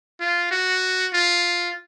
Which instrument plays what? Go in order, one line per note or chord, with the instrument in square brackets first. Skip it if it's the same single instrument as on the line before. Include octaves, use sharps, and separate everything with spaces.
[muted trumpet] F4
F#4
F4